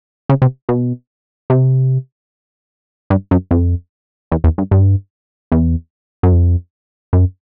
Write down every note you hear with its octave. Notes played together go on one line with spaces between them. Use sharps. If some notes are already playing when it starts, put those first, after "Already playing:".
C#3
C3
B2
C3
G2
F#2
F2
E2
E2
G2
G2
E2
F#2
F2
F#2